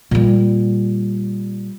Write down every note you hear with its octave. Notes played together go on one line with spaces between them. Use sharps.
A#2 G3